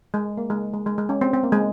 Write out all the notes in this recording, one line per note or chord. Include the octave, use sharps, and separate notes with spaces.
G#3
A#3
G#3
G#3
G#3
G#3
C#4
C4
C4
A#3
G#3